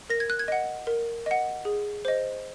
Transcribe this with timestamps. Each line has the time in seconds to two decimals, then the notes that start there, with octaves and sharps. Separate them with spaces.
0.10 A#4 A#6
0.20 G#6
0.30 F#6
0.39 G#6
0.48 D#5 F#5
0.87 A#4
1.26 D#5 F#5
1.65 G#4
2.05 C5 D#5